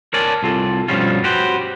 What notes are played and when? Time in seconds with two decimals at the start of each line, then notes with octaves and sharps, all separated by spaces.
0.14 A#4 C#5 D5 G#5 A5
0.43 C2 F4 A4
0.88 G2 B2 F3 G3 C#4 F4
1.24 F#4 G4 B4 C5